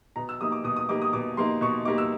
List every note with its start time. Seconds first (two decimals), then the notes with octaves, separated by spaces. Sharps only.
0.16 B2 A#5
0.29 E6
0.40 G3 A#3 D#4 D#6
0.52 D6
0.64 B2 D#6
0.77 D#6
0.88 G3 A#3 D#4 D6
1.02 D#6
1.13 B2 D6
1.37 G3 A#3 D#4 C6
1.61 B2 C#6
1.85 G3 A#3 D#4 D6
1.98 E6